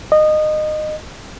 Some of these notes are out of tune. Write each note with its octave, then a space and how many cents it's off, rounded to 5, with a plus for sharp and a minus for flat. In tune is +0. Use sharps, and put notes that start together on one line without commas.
D#5 -20